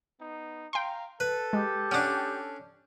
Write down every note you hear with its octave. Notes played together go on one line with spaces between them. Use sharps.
B3 D#4
F5 G5 A#5 C6
A4 B4
G#3 G4
C#4 D4 F#5 D6